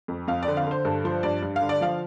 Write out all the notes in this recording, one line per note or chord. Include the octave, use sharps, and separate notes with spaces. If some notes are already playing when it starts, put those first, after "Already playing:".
F2
F2 F5
D5
D3
F5
D3 C5
G2 A4
F3 C5
G2 D5
G2
F5
D3
D5
F3 F5